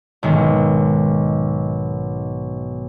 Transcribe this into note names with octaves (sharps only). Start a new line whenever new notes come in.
B1 G#2 D#3